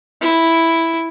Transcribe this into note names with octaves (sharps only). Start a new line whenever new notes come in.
E4